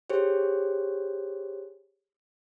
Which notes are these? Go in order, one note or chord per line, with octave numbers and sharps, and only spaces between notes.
G4 G#4 C5 C#5